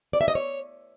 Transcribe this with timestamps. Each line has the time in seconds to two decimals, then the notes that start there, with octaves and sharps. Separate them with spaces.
0.13 D5
0.21 E5
0.28 D#5
0.35 C#5